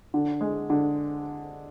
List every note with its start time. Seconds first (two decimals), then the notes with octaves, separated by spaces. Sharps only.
0.14 D3
0.41 G#3
0.70 D3